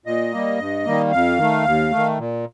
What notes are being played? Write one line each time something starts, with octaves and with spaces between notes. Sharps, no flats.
A#2 D#5
G3 A#3
G2
D#3 G3 A#3
F2 F5
D#3 A3
D#2
A3
D#3
A#2